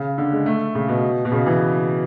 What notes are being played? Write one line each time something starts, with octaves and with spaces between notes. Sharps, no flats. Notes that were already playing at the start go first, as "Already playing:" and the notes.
Already playing: C#3
D3
G#3
A3
C#3
B2
B2
C#3
E3